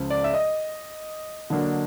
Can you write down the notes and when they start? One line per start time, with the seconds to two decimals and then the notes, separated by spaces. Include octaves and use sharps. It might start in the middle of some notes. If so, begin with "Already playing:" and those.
Already playing: C#2 C#3 F3
0.10 D5
0.24 E5
0.34 D#5
1.50 D3 F#3 A#3 D4